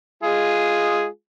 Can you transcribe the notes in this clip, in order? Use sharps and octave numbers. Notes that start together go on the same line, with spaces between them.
G#3 F4 G#4